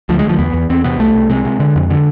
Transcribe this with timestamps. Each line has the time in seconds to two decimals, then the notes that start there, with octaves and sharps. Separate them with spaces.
0.09 D2 F3
0.19 G#3
0.25 D2 F3
0.39 E2 B3
0.54 E2
0.69 E2 C4
0.84 C3 B3
0.99 C2 A3
1.15 C2
1.30 C3 G#3
1.45 C3
1.60 D3
1.76 F2
1.90 D3